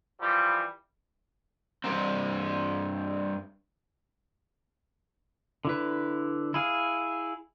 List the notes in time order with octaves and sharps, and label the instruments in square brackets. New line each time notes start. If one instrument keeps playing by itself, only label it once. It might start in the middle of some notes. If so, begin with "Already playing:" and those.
[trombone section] E3 F3 G3
[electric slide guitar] G2 C#3 G3 C4
[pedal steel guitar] D3 E4 B4
E4 G#4 F5